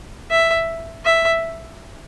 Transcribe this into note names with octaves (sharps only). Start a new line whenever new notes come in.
E5
E5